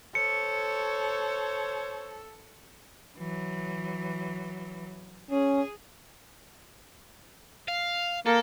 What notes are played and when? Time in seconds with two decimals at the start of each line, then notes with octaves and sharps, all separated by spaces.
0.15 A4 C5 C#5 C#7
3.18 E3 F#3
5.31 C#4 G#4
7.68 F5
8.26 A#3 A4